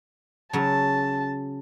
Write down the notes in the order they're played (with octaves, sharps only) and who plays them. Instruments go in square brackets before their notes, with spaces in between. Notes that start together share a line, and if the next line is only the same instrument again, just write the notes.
[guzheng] C#3 F#3 [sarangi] A5